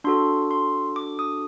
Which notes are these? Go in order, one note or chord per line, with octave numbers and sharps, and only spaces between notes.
D4 F#4 A4 C6
C6
D6
D#6